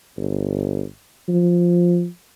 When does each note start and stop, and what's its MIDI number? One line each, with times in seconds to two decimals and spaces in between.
0.17 0.84 31
1.28 2.07 53